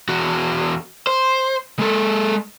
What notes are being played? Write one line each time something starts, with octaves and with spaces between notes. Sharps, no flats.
E2 F#4
C5
G#3 A4